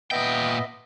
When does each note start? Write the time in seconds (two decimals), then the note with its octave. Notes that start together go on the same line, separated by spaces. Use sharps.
0.11 A#2 B3 D#5 E5 G5